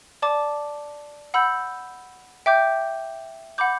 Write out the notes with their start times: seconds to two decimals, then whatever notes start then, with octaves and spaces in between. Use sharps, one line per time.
0.22 D5 A5 D6
1.34 F#5 B5 E6 G6
2.46 E5 G5 D6 G6
3.58 F#5 B5 D6 G6